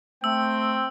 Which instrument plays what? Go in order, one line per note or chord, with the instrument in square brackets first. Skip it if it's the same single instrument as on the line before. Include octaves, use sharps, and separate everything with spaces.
[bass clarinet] A3 [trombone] C4 [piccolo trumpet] G5 [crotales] E6